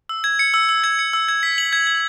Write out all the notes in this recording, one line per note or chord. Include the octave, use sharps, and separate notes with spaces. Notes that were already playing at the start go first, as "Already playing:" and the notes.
E6
G#6
C#7
E6
E6
G#6
C#7
E6
G#6
B6
F#7
G#6
G#6